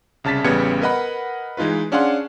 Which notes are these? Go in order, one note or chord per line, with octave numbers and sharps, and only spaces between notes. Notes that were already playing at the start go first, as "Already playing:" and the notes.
C2 C#3 A5 A6 B6
A1 C#3 G3 B3 G#6 C#7
A#4 B4 D#5 F#5 B5
E3 G#3 D#4 F4 B4
C#4 D4 G#4 F5 F#5 C6